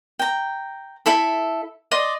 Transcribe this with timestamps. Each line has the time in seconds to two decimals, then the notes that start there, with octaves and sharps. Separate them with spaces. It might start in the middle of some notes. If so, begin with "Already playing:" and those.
0.19 G5 A#5
1.06 E4 A4 E5
1.91 D5 D#5 C6